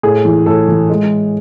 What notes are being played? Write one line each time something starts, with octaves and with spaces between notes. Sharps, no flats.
A2 G#4
E3
A2 A4
E3
G#3